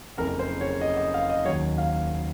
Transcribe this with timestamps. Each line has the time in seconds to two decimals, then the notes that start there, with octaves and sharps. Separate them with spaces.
0.17 F#1 F2 C#3 A#4
0.39 C5
0.61 C#5
0.81 D#5
0.97 D#5
1.14 F5
1.30 D#5
1.45 D#2 D#3 F#3 C#5
1.78 F5